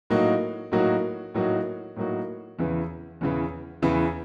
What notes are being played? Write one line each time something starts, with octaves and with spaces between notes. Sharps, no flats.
A2 F#3 A#3 D#4 F#4
A2 F#3 A#3 D#4 F#4
A2 F#3 A#3 D#4 F#4
A2 F#3 A#3 D#4 F#4
E2 C#3 E3
E2 C#3 E3
E2 C#3 E3